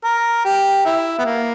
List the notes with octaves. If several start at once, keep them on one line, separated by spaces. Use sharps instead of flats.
A#4
G4
E4
B3
A#3